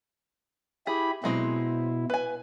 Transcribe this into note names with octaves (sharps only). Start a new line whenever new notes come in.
E4 G4 G#4 B5
B2 F#3 G#3 C4 E4
B4 G#5